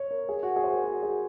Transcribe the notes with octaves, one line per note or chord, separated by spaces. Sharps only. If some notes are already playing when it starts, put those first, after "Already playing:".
Already playing: C#5
A#4
G#4
F#4
G#4
C5
A#4
F#4
G#4